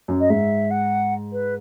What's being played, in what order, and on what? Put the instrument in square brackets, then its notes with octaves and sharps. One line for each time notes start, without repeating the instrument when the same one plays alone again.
[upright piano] F#2
[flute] D#5
[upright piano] G#2 [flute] E5
[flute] F#5
B4